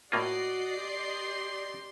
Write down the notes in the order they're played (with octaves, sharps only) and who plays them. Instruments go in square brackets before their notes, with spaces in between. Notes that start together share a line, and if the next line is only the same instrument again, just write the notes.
[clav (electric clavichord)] A2 A#3 F4 [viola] F#4 [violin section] D5 D#5 C7
[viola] G4 [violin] C6